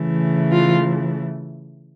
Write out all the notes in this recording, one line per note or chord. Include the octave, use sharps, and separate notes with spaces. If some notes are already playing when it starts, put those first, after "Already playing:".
Already playing: C#3 E3 A3
F4